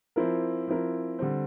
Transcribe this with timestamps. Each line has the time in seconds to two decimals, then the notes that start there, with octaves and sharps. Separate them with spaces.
0.16 F3 C4 E4 A#4
0.67 F3 C4 E4 A#4
1.19 D3 G3 C4